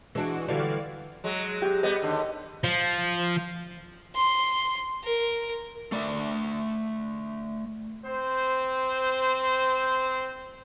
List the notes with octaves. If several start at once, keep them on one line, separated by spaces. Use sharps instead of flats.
E3 G#3 D4 F#4
D3 E3 G3 F#4 D5 F5
F#3 G#3
G4
G3 B3 D#5
D#2 D3
F3
C6
A#4
A3 D5 E5
C4 C5